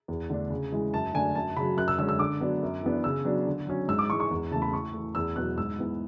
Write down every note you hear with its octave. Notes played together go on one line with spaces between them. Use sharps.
E2
D3 A3 D4
C#3
E3 G#3
F#2 A5
D3 A3 D4 G#5
F#2 A5
C#3 F#3 B5
F#2 F#6
E6
D3 G#3 C#4 E6
E6
D3 D6
F#3 B3 D4
F#2
E3 B3 D4
C#3 E6
F#3 B3 D4
D3
F#3 C#4
G#2 E6
D6
E3 G#3 C#6
C#6
E2
C#3 E3 A3 A5
B5
A2 C#6
E3 A3
E2 E6
B2 F#3 B3 F#6
G#2 E6
E3 B3